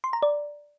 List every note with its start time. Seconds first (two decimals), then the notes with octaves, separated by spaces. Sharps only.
0.04 C6
0.13 A#5
0.23 D5